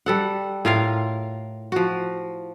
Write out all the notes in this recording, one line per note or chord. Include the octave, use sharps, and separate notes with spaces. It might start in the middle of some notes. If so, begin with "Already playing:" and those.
G3 A4 F#5
A2 F4 A#4 F5
F3 F#4